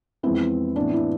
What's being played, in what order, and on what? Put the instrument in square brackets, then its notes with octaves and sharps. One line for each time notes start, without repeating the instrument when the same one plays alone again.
[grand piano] F2 E3 G#3 B3 E4 [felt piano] C4
[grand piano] A2 E3 B3 [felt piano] D4
[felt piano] E4